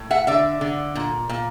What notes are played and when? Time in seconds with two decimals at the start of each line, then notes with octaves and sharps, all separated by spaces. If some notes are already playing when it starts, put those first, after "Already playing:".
Already playing: A2
0.10 E5 F#5
0.27 D3 D5 E5
0.61 D3
0.96 A#2
1.29 A#2